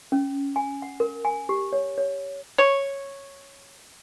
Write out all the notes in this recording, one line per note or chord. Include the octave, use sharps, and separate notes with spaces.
C#4
G#5
F#5
A#4
G#5
G4
C#5
C#5
C#5